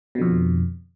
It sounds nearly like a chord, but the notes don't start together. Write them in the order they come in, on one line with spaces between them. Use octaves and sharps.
B2 D3 F2